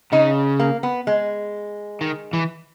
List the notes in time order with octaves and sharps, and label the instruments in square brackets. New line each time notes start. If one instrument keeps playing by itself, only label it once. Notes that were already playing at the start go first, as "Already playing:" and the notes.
[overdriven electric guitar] C#3 [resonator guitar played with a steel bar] D#4
[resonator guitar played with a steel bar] A#3
B3
G#3
[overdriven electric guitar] D#3
E3